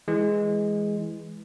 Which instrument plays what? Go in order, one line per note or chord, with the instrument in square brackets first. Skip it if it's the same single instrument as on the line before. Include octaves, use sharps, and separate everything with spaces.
[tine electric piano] E3 G#3